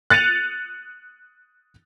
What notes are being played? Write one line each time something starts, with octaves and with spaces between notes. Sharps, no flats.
F#6 A6 C#7 D#7 F7